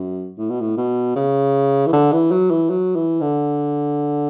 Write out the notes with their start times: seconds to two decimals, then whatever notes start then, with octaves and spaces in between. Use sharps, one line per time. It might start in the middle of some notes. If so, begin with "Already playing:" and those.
Already playing: F#2
0.38 A2
0.50 B2
0.61 A2
0.77 B2
1.16 C#3
1.87 E3
1.93 D3
2.13 E3
2.31 F#3
2.50 E3
2.70 F#3
2.96 E3
3.21 D3